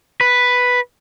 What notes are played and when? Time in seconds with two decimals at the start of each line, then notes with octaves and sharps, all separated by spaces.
0.21 B4